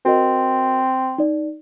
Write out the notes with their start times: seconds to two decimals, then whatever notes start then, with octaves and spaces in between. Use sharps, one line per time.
0.06 C4 F#4 A#4 D#5
1.18 D#4 D5